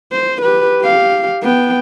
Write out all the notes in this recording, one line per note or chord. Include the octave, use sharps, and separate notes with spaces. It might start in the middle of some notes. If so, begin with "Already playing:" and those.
C5
G4 B4
G4 F5
B3 G5